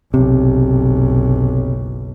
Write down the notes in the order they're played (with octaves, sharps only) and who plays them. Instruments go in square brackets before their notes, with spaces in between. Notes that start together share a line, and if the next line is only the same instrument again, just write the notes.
[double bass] F#1 B1 [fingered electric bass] C3